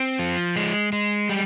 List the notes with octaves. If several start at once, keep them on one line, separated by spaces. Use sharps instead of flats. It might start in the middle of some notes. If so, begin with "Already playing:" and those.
Already playing: C4
F3
G#3
G#3
G3